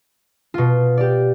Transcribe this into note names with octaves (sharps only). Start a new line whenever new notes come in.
B2 F4
G4 D5